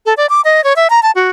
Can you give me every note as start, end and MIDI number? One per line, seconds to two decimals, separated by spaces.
0.06 0.14 69
0.17 0.26 74
0.29 0.41 86
0.45 0.63 75
0.64 0.73 73
0.76 0.88 76
0.90 1.00 82
1.03 1.11 81
1.15 1.30 66